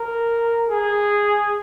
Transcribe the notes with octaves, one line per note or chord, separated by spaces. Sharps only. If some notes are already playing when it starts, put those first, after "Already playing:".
Already playing: A#4
G#4